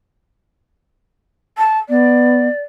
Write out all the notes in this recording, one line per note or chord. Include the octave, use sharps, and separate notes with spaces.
A5
B3 D5